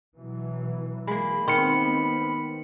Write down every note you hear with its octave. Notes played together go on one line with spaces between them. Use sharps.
B2 E3 F#3
G#3 A#3 B5
D#3 B3 C4 C6 C#7